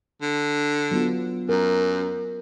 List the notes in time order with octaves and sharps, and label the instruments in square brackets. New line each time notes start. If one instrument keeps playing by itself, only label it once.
[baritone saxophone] D3
[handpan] F#3 B3 F4
[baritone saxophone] F#2 [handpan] A#4